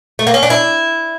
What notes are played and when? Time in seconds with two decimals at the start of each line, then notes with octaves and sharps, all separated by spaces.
0.19 A3
0.27 A#3
0.34 C#4
0.43 D4
0.50 E4